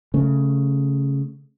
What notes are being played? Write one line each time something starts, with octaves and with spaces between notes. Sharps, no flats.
C#3 A3